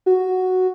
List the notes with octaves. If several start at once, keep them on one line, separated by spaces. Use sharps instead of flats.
F#4